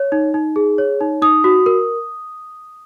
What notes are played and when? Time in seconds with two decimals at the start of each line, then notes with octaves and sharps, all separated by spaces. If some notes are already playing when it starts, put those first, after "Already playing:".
Already playing: C#5
0.12 D#4
0.34 D#4
0.56 G#4
0.78 C#5
1.01 D#4
1.22 D#4 D#6
1.44 F#4
1.66 A#4